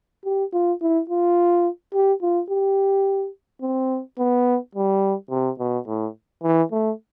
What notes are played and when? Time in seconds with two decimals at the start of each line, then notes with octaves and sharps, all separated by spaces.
0.25 G4
0.53 F4
0.82 E4
1.09 F4
1.94 G4
2.22 F4
2.50 G4
3.62 C4
4.18 B3
4.75 G3
5.31 C3
5.59 B2
5.88 A2
6.43 E3
6.72 A3